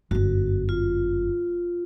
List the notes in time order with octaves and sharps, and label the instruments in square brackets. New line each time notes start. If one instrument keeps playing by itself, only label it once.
[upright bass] G1 F#2 [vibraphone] F#4
[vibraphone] F4